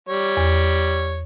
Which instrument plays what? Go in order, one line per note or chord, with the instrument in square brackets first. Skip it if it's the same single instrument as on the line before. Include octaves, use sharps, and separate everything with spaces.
[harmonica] G3 C#5
[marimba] E2